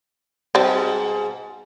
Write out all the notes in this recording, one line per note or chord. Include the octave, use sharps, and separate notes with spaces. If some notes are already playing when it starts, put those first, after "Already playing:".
G#2 B2 G3 C4